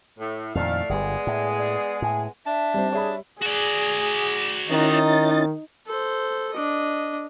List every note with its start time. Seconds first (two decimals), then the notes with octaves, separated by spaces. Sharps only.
0.19 A2
0.55 F2 A#2 D#3 A3 E4 D5 F5
0.89 G1 G3 G#3 B3 G#4
1.27 A2
1.57 D5
2.02 A2 G#5
2.46 D4 E5 A5
2.74 G3 C4 C5
2.93 G#4 C#5 E5 B5
3.42 F#4 G#4 D5
4.71 D#3 C#4 D#4 E4 A6
5.87 A4 C5
6.54 D4 D#5